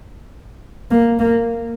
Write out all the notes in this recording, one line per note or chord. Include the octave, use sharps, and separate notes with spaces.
A#3
A#3